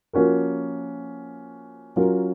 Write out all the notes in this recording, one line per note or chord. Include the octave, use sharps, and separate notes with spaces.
F3 A#3 C#4 F#4 A#4
F#3 C#4 F4 A#4